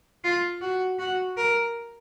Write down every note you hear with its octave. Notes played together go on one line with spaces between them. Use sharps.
F4
F#4
F#4
A#4